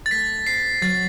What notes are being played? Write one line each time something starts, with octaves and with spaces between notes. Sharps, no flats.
A6
A3 B6
C4 C7
F#3 A6